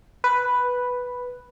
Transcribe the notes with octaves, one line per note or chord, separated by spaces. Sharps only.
B4